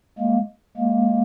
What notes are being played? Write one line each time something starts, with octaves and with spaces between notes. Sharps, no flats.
G#3 A#3
G#3 A#3